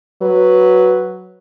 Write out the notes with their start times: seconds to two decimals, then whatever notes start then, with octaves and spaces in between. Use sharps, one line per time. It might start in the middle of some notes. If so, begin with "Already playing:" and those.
0.22 F#3 B4